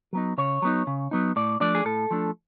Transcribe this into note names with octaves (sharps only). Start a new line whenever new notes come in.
F#3 B3 D#4
C#3 C#5
F#3 B3 D#4
C#3
F#3 B3 D#4
A2 D5
F3 A3 D4 D5
G#4
A2 A4
F3 A3 D4